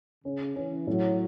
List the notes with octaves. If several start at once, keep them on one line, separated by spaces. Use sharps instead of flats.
C#3 C#4
E3 C#4
A2 F#3